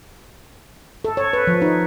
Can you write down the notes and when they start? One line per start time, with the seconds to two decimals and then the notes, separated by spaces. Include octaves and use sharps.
1.05 A4
1.17 C#5
1.33 B4
1.47 F3
1.62 D#4